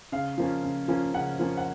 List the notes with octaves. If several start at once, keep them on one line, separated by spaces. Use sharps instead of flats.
C#3 F5
F3 A#3 C#4
C#3
F3 A#3 C#4
C#3 F#5
F3 A#3 C#4
F#5